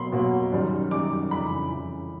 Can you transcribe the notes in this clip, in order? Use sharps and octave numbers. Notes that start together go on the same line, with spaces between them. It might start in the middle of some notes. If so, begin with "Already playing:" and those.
Already playing: B2 F#3 A#3 B5 C6
B2 F#3 A#3
F#2 D#3 G3
F#2 D#3 G3 D6
F2 C#3 E3 B5
F2 C#3 E3